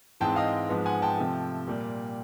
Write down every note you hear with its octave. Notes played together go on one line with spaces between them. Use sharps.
G#2 E3 G#3 C4 G5 A5
D#5 F5
G#2 F3 G#3 B3
F#5 G#5
G5 A5
C3 F3 A3
A#2 G3 A#3